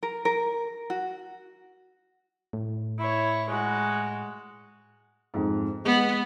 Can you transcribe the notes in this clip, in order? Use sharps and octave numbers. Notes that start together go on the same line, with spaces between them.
A#4
A#4
F#4
A2
E4 C#5
G#3 F#4
F2 G#2
G#3 B3